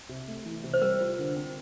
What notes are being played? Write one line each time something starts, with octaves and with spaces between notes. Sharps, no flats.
C3
A3
E3
C3
C5
G3 A#4
F4
D3
C4